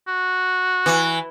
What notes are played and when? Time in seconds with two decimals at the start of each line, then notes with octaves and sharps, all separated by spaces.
0.08 F#4
0.86 E3